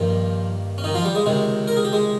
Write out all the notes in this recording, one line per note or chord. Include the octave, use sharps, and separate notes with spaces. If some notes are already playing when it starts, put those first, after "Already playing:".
Already playing: G2 D#3 F3 A#3 F4
C#4
D#3 D#4
F3 F4
G3 G4
G#3 G#4
C#2 C3 D#3 G#3
A#4
G#4
G4
G#3 G#4